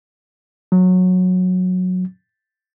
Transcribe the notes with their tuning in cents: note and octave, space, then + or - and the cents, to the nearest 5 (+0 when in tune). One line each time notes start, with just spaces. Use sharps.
F#3 -15